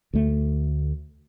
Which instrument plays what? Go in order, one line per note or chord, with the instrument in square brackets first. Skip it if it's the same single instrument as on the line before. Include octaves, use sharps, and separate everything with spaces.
[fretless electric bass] D2 A3